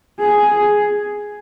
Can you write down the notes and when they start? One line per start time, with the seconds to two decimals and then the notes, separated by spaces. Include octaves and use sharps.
0.20 G#4